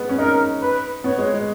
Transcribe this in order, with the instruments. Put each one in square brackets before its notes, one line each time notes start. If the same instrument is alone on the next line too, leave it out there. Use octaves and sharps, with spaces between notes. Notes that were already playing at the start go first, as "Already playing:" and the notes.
Already playing: [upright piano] G#3 B3
C#4
[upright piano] D#4 [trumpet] A#4
[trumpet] B4
[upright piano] B3 [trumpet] C#5
[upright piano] G#3
G#3